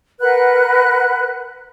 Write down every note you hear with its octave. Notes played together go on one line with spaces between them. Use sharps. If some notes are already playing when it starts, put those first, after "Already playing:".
A#4 B4 F#5 F#6